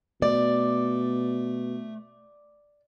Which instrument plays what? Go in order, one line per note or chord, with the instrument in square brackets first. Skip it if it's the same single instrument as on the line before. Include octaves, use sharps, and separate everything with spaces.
[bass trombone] B2 [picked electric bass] A3 [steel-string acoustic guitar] D5